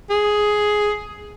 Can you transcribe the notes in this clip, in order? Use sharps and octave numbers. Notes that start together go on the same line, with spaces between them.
G#4